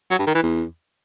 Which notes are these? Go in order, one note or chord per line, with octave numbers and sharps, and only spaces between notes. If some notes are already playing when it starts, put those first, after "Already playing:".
F#3
G2
D#3
E3
E2